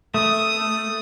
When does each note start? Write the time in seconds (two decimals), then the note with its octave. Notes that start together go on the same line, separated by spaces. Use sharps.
0.14 A3 D#6